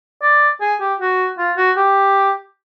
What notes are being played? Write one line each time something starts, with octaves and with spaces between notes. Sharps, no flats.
D5
G#4
G4
F#4
F4
F#4
G4